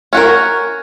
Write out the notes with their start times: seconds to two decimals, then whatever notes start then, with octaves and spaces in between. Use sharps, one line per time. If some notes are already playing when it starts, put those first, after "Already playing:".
0.13 C#4 F#4 A#4